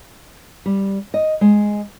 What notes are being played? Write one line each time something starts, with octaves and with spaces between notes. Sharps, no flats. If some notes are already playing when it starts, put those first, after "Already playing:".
G3
D#5
G#3